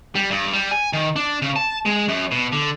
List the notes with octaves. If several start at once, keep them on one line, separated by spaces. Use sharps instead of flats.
G3
G2
G3
G#5
D#3
D4
C#3
A5
G#3
F#2
B2
D3